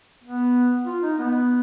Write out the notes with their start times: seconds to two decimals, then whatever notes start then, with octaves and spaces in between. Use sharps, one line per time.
0.24 B3
0.86 F4
1.03 D#4
1.18 B3